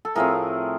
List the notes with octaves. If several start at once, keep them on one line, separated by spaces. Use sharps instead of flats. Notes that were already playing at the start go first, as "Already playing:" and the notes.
A4
A2 F3 A3 C4 G#4 A#4